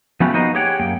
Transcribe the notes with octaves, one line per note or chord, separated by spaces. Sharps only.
F3 A3 B3 C#4 F#4 G4
A#3 B3 D#4 F#4 C5 D#5
G4 G#4 C#5 F#5 G5
F#2 A#3 G5